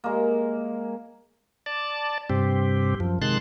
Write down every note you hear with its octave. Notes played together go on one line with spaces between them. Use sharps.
G#3 A#3
D5 A5
G2 C3 C4 G4
F#2 F3
C3 D#3 G#3 A5 C6 F#6